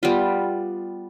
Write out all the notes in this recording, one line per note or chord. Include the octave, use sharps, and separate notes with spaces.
G3 B3 F4